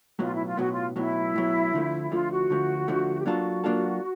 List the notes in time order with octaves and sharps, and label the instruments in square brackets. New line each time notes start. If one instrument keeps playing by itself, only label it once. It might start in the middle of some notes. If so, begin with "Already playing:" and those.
[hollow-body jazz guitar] B1 A2 F#3 B3 [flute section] F4
[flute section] E4
F4
[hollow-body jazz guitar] B1 A2 F#3 B3 [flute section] F#4
[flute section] F4
[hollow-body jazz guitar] B1 A2 F#3 B3 [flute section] E4
[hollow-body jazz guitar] B1 A2 F#3 B3
D2 D3 F3 A3
[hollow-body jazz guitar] D2 D3 F3 A3 [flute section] F4
[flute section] F#4
[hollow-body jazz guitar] D2 D3 F3 A3
D2 D3 F3 A3
[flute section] G4
[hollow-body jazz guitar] F#3 A#3 D4 F4 A4 [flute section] F#4
[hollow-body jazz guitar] F#3 A#3 D4 F4 A4